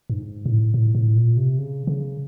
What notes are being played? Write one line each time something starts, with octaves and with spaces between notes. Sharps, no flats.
G2
G#2
A2
A2
A2
A#2
C3
C#3
C#3